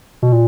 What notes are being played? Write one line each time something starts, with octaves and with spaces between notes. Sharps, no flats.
B2
A#2